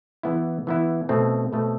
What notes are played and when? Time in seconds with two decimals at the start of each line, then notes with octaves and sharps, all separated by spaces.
0.23 E3 B3 E4
0.67 E3 B3 E4
1.09 B2 A3 C4
1.53 B2 A3 C4